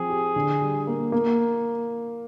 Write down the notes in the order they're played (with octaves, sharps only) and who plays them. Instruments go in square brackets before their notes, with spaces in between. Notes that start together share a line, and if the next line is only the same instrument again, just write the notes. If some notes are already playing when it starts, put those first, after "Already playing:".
Already playing: [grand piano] F3 C4 [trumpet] G#4
[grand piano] G4
D3
G3
A#3
A#3